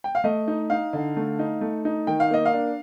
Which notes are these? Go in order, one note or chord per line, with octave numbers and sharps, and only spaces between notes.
G5
F5
A3 D#5
D#4
D#4 F5
D3
A3
D#4
A3
D#4
D#3 G5
F5
A#3 D#5
F5
D4